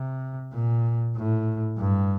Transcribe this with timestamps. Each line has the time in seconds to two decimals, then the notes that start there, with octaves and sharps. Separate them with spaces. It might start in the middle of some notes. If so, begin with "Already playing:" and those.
Already playing: C3
0.53 A#2
1.16 A2
1.78 G2